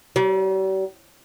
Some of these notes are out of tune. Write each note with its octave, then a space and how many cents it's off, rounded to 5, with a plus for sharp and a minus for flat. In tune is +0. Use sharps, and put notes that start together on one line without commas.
G3 -45